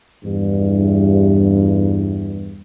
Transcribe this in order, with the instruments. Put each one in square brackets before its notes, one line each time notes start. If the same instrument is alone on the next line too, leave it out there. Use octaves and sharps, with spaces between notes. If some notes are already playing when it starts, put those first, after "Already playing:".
[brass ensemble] E2 G2